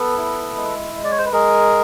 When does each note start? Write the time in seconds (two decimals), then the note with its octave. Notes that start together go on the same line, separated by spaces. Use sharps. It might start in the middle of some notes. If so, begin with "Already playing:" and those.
Already playing: B3 A4 B4
0.17 E4
0.56 G#3
0.95 G#3
1.04 D5
1.11 C#5
1.18 C5
1.26 B4
1.32 G#3 G#4 A#4